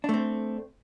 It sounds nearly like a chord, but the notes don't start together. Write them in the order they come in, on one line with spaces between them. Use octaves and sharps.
D4 A3 C4